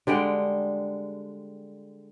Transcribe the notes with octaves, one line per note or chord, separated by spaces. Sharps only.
D3 G3 G#3 G5